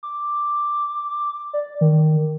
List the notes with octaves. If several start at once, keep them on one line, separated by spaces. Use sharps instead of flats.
D6
D5
D#3